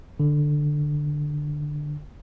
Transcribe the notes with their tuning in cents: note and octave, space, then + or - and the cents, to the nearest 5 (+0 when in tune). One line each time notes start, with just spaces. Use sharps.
D3 +10